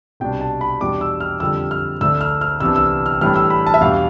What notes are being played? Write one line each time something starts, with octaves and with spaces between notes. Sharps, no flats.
C2 B2 G3 D4 G5
A5
B5
E2 B2 G3 D4 D6
E6
F6
F2 D3 G3 E6
F6
D2 D3 A3 D4 E6
F6
F6
C2 C3 E3 B3 D4 E6
E6
F6
A2 E3 G3 D4 F6
E6
B5
A5
E5
E2 B2 G3 D4 F5